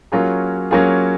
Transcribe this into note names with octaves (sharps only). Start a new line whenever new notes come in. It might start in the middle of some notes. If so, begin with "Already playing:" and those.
F#3 A#3 C#4 F4 G#4
F#3 A#3 C#4 F4 G#4